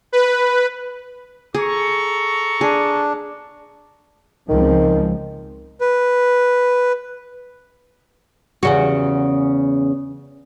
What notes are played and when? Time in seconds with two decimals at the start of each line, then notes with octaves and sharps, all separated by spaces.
0.13 B4
1.54 G#4 A4 A#5 C#6
2.61 D4 G#4
4.49 C#2 D#3 F3 C4
5.81 B4
8.63 E2 C#3 F#4